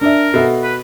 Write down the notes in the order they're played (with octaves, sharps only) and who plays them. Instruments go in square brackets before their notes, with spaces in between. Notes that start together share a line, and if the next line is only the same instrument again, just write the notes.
[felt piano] D4 D5 E5 [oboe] A#4
[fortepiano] B2 [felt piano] A4 E5 F#5
[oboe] B4